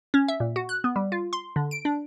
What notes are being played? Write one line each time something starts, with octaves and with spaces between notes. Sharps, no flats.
C#4
E5
A#2
F#4
F#6
B3
G3
F4
C6
D3
D7
D4